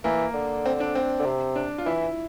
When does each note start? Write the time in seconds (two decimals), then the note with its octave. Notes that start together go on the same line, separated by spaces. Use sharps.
0.04 E3 A#3
0.34 D3
0.66 C4
0.80 D4
0.95 C4
1.20 D3
1.25 C3
1.56 D4
1.78 F4
1.86 E3 E4